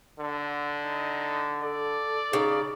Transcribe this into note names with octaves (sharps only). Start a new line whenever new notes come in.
D3
D#4
A4 D5
C#3 D#4